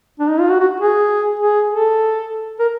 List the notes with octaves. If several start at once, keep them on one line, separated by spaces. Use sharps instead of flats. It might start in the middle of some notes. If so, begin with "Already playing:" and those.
D4
D#4
F4
F#4
F#4
G#4
G#4
A4
A#4